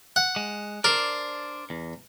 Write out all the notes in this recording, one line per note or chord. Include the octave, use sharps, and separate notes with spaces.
F#5
G#3
D4 A#4 C5 D5
E2